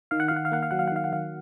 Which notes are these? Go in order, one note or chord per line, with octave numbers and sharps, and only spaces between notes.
D#3 F5
F#5
D#3 F5
F#5
F5
A#3 F#5
F5
F#3 F#5
F5
F#5
D#3 F5
F#5
D#3 F5